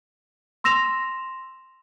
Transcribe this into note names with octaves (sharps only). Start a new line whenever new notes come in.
C6 E6 A#6 E7 F7